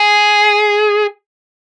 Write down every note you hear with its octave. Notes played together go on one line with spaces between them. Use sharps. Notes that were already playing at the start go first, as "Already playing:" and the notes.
Already playing: G#4